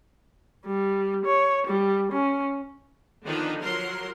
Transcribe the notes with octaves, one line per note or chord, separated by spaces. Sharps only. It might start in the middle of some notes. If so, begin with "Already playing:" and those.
G3
C#5
G3
C#4
D3 D#3 F3 B3 D4 D#4
F3 F#3 A#4 C6